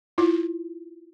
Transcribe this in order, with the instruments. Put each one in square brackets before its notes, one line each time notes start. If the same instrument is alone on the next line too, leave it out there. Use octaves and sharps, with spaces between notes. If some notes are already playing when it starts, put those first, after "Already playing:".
[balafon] E4 F4